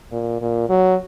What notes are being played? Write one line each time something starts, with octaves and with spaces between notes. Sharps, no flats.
A#2
A#2
F#3